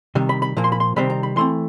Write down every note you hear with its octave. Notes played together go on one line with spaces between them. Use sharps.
C3 D#3 G3
B5
B5
A#2 F3 A#3
C6
B5
C6
C3 D#3 G3 C4 B5
A#5
B5
E3 A3 C4 C6